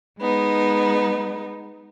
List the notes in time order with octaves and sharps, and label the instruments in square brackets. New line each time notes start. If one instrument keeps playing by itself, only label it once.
[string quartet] G#3 B3 D#4